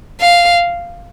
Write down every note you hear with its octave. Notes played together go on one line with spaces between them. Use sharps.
F5